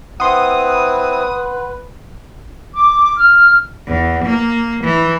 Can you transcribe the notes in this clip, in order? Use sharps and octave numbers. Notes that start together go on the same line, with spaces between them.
C4 E4 B4 F#5 C6 D#6
D6
F6
E2
A#3
E3